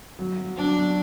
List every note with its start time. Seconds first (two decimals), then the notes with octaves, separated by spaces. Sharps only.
0.19 F#3
0.38 F#3
0.57 F#3 D4
0.76 F#3